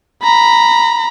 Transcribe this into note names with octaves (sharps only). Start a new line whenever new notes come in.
A#5 B5